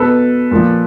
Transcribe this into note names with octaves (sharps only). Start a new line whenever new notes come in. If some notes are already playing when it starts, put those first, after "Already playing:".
Already playing: B2 A4 B4
A#2 F3